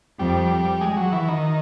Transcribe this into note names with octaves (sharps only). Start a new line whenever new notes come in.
F2 G3
G#3
F#3
E3
D#3